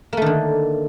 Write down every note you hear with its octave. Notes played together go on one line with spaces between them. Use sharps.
D3 D#3 A3 A#3